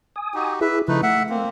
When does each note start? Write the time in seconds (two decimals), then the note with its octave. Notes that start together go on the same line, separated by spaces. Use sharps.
0.16 G#5 D#6
0.34 D#4 F#4 G4
0.61 E4 G#4 B4 E5
0.88 C#3 F3 A3 D#4 E4 B4
1.03 A3 E5 F#5
1.29 A#3 C4